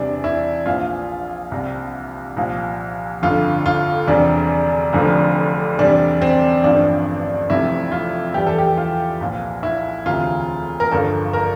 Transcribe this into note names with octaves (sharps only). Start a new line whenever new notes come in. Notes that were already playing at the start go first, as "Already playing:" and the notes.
Already playing: E2 C3 E3 G3 D4
E4
A#1 A#2 F3 F4
C2 C3 G3
C2 A#2 F3
G1 F2 D3 F4
F4
E1 E2 C3 G3 D4
F1 F2 D3 F3
E2 C3 G3 D4
C4
A1 G2 F3 D4
F1 F2 C3 F3 E4
F4
E2 E3 G3 G4
A4
G4
F4
C2 A#2 F3
E4
E1 D2 C3 F4
A#4
G1 G2 F3 A4
A#4